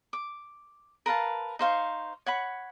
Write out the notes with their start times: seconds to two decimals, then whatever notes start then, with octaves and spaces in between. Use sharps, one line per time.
0.13 D6
1.06 A#4 B4 F5 A5
1.59 D#4 C5 F5 C#6
2.26 C#5 F#5 B5